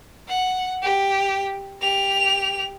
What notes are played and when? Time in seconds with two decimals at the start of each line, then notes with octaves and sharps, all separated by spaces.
0.28 F#5
0.82 G4
1.82 G4 F7